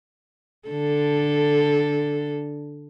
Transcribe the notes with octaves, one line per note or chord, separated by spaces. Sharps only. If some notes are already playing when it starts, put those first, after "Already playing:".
D3 A4